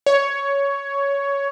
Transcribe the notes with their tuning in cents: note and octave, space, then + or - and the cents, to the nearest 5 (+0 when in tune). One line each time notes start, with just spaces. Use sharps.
C#5 +10